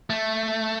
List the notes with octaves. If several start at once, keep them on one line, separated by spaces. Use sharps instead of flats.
A3